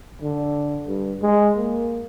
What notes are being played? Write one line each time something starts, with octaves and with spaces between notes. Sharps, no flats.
D3
G2
G#3
A#3